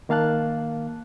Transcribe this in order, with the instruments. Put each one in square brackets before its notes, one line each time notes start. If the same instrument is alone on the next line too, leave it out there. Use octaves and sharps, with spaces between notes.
[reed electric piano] D#3 A#3 F5 A5 F#6